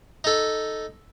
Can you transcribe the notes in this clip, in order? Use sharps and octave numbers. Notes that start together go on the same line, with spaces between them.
D#4 A4